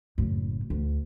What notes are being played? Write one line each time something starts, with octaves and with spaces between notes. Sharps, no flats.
F#1 A2
D2